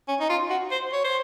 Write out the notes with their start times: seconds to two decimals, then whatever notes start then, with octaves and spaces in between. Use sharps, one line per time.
0.08 C#4
0.20 D#4
0.29 F4
0.50 F#4
0.71 C5
0.93 C#5
1.04 C5